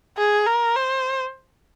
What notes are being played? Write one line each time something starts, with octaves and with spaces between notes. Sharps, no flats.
G#4
A#4
C5